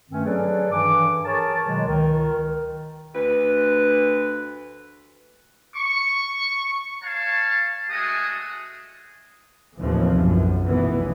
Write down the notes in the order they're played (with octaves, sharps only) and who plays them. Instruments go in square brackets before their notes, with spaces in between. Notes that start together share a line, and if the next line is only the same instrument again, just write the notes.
[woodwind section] G2 D#3 A3 C4 C#4
F#3 G#4 A4 B4 D5
G2 D#3 E3 D6
G#4 A#4 C#5 A5
B2 D#3 F#3 G#3
C#2 D#3
[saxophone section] D2 B4
[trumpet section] C#6
C#5 F5 A5
G#3 A3 F#4 G#4 D#6
[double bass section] D#2 A2 C3 E3 F3
B1 F#2
F1 B2 E3 B3